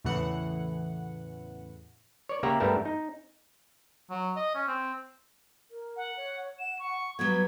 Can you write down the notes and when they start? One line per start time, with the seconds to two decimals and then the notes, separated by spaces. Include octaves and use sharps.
0.04 E2 A2 C#3 E3 F#5
2.29 C#5 D5
2.43 C#3 A#3 G4 E5 F#5 A#5
2.60 G2 G3 A3 B3 A#4 A5
2.85 D#4
4.10 F#3
4.36 D#5
4.55 C#4
4.68 C4
5.70 A#4
5.96 F#5
6.16 C#5
6.59 F#5 E7
6.79 C#6
7.19 F#3 G3 B3 B4 G#6